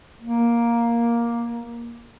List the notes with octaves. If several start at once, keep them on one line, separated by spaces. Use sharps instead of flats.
A#3